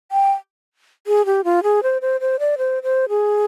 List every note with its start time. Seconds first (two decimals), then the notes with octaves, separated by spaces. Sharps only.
0.12 G5
1.07 G#4
1.26 G4
1.44 F4
1.63 G#4
1.83 C5
2.02 C5
2.21 C5
2.39 D5
2.58 C5
2.83 C5
3.09 G#4